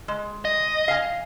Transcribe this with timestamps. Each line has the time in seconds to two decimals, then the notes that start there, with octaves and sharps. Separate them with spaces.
0.08 G#3
0.45 D#5
0.88 F5 G#5